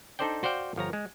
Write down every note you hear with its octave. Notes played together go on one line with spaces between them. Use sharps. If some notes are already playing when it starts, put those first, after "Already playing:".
D4 D#4 A4 C5 D5 G5
F#4 C5 D5 F5 G5
G1 F3 C#5 A#5
G#3